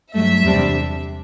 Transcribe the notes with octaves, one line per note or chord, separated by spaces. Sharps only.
G2 F#3 A3 E5
E2 C3 G3 D4